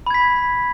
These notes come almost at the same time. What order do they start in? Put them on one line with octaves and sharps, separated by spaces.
B5 G#6 B6